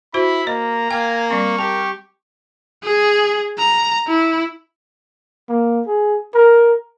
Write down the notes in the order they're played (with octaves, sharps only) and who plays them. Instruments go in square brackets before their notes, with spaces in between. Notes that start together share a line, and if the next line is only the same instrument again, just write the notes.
[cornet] E4 [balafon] F#4 C5 [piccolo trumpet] B5
[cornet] A#3 [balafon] D#5 [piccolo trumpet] A#5
[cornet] A#3 [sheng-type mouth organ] F5 G#5 [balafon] G5
[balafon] G3 C4 [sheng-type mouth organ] C#6
[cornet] G4 [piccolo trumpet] A#4 [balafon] A5
[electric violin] G#4
A#5
E4
[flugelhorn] A#3
G#4
A#4